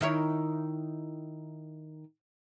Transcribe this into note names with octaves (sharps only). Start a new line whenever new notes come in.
D#3 E4 C#5